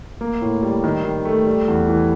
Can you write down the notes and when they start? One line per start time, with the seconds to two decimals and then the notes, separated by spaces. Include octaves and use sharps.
0.21 A#3
0.42 A2
0.63 G3
0.84 D#3
1.04 D#3
1.25 A3
1.46 G3
1.68 E2
1.89 E3